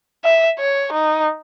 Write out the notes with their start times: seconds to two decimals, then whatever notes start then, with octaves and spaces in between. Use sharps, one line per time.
0.24 E5
0.59 C#5
0.92 D#4